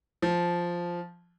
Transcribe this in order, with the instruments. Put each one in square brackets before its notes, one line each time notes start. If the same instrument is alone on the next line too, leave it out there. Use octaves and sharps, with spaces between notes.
[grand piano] F3